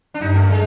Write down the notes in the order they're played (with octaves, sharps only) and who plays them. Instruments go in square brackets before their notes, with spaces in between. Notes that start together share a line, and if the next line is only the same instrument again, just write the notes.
[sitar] D4
[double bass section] G2 [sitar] D#4
[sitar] A3
G#3